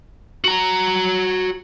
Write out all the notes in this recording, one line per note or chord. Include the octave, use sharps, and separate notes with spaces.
F#4 A#5